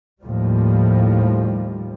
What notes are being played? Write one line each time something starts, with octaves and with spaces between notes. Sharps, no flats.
D#2 A2 F3 G3